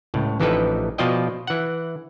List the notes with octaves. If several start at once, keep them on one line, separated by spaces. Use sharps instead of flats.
C#2 A2
A1 E3 F3 D#4 A4 B4
B2 F3 F4 D5 D#5 G5
E3 F#5